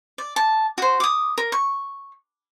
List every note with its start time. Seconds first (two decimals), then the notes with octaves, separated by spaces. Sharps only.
0.18 D5
0.36 A5
0.78 F#4 C5
1.00 D6 D#6
1.38 A#4
1.52 C#6